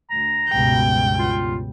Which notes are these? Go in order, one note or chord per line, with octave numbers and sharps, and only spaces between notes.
D2 A#5
C#2 G2 B2 G5
F4